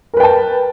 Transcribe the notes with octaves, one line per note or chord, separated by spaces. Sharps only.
A#4 B4 G5 A5